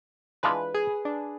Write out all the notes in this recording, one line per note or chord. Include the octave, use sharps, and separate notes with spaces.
E3 G#3 D4 F4 B4
G#4
D4